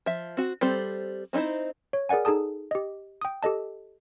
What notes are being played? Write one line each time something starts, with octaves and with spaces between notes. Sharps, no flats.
F3 E5
C4 F#4
G3 C4 A4 C5
C4 C#4 D#4 E4 C5
C#5
G#4 A#4 D5 F#5 G#5
D#4 G#4 A4 A5 D#6
G4 D#5
G5 D#6
G4 A4 D#5 A5